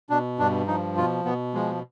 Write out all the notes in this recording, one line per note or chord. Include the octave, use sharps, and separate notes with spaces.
B2 D4
G2 D4
F3 D#4
B2 F4
B2 B3
F3 G#3